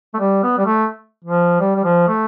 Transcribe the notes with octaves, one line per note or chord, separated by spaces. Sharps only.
A3
G3
B3
G3
A3
F3
G3
G3
F3
A3